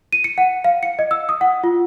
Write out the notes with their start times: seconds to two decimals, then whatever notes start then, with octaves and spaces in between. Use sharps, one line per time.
0.13 D#7
0.24 C#7
0.38 F#5
0.64 F5
0.83 C#7
0.99 D#5
1.11 E6
1.29 D#6
1.41 F#5
1.64 F4